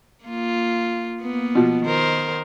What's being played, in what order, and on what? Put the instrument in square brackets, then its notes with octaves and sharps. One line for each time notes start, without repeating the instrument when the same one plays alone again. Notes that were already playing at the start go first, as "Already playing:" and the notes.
[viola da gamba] A#3 F4
A#3 B3
[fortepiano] B2 F3
[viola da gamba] D#3 A#4 C5